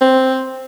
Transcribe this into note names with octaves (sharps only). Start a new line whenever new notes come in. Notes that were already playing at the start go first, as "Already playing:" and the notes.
C4